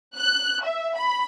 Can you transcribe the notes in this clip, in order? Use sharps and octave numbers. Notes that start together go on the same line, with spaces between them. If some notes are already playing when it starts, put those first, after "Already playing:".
F#6
E5
B5